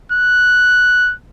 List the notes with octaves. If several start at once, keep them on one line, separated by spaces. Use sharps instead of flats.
F#6